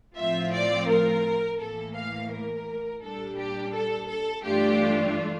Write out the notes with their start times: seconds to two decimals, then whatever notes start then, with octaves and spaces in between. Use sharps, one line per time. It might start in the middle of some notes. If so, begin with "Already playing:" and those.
0.18 A2 F3 C4 F4 E5
0.54 D5
0.89 A#4
1.60 A2 E3 A#3 A4
1.96 F5
2.31 A#4
3.02 A#2 G3 D4 A4
3.38 G4
3.74 A4
4.09 A4
4.44 G2 E3 A3 D4 F4 G4